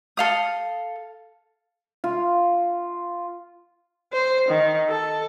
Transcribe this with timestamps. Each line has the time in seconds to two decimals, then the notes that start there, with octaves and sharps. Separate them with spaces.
0.17 A4 F5 D#6
2.04 F4
4.13 C5
4.49 D#3
4.89 A4